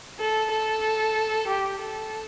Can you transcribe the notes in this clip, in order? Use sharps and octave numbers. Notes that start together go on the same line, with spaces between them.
A4
A4
G4
A4